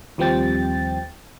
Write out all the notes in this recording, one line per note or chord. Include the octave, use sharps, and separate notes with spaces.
D#2 F3 G3 C4 G5 A6